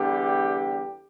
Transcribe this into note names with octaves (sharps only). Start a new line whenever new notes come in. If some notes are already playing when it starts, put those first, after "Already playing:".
Already playing: E2 D3 G3 G4